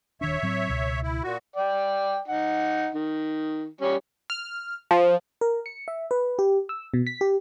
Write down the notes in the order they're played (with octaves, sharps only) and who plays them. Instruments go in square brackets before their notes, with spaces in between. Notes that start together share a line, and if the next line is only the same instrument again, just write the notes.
[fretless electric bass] D#1 D#3 D4 [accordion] C#5 E5
[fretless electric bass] A2 F#3 C4
C#2 B2
[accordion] E4
A#2 F#4
[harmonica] D5 G5
D#4 F#5
D#3
G3 C#4 C#5
[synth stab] F6
F3
[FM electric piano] A#4
C#7
E5
B4
G4
E6
B2
B6
G4